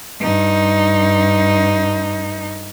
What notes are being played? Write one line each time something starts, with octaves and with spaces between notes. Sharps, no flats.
G2 D#4